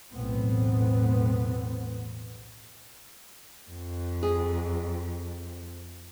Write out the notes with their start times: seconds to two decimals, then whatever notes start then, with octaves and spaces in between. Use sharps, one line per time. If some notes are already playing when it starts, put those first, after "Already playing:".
0.13 B1 E2 A2 B3 C4
3.70 F2
4.23 G#4